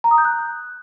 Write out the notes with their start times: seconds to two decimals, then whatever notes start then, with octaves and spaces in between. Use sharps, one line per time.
0.04 A#5
0.11 D#6
0.18 G6
0.25 F#6